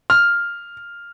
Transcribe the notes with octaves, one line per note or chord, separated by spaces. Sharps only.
F6